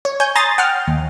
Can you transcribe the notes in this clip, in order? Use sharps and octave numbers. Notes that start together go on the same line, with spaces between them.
C#5
C#5 G#5 G6
G#5 A#5 C6 D#6 A6
F#5 G5 F6
D#2